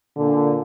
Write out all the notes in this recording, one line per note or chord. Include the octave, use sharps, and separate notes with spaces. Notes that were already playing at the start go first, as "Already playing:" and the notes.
A#2 D3